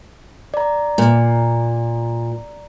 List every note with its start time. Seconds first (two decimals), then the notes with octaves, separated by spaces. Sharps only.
0.54 D5 A#5
0.98 A#2